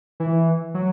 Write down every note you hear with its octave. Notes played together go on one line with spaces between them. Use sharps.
E3
F#3